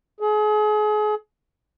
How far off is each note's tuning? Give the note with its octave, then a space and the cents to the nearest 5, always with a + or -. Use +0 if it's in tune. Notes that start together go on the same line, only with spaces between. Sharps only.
G#4 +35